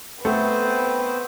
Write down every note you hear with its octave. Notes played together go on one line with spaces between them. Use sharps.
A3 B3 C4 B4 C5